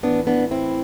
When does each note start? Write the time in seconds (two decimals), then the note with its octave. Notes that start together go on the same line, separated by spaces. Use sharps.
0.03 A2 E3 B3 D4
0.27 B3 D4
0.51 C4 E4